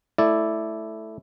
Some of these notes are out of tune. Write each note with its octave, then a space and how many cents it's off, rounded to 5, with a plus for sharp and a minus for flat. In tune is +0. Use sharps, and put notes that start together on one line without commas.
A3 +0 E4 +0 D5 +0